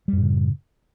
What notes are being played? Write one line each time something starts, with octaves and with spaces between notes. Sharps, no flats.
F#2 A2 C#3 G3